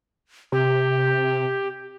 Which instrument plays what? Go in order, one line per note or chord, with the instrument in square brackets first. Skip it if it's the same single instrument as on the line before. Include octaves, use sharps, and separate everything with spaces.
[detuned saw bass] C3 [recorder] G4